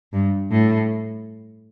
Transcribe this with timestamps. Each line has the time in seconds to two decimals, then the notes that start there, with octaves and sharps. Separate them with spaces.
0.13 G2
0.51 A2